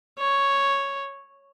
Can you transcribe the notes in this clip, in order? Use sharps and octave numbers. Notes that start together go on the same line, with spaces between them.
C#5